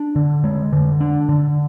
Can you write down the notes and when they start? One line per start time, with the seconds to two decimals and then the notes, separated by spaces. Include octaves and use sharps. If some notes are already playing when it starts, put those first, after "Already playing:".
Already playing: D4
0.16 D3
0.44 G#3
0.73 D3
1.01 D4
1.29 D3